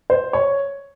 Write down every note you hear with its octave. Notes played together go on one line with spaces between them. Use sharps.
C5
C#5